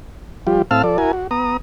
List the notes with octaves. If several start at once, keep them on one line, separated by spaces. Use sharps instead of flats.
F3 G3 F4 G4
A2 C4 F5 A5 E6 F6
F3 A4 D5
E4 F#4 A#4 G#5
F#4
B3 A#5 D#6